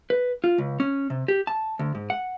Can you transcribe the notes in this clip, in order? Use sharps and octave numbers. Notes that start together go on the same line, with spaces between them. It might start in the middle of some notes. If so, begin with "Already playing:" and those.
B4
F4
C#2
C#4
C3
G4
A5
D2
G#2
F#5